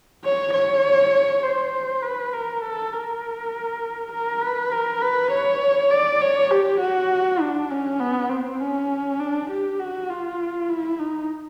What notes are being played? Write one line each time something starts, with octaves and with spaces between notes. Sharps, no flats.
C#5
C#5
C5
B4
A#4
A4
A#4
A#4
B4
A#4
B4
C#5
D5
C#5
G4
F#4
D4
C#4
B3
C4
C#4
D4
G4
F#4
F4
E4
D#4